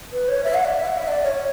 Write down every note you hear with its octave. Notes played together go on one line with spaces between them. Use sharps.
B4
C#5
E5
F#5
D5
E5
F#5
E5
D5
C#5